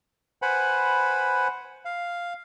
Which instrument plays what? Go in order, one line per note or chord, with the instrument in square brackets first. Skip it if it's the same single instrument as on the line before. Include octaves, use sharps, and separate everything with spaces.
[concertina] B4 C5 F#5 G#5 B5
F5